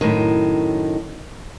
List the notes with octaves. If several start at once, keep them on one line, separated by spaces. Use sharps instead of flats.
F#2 A2 D#3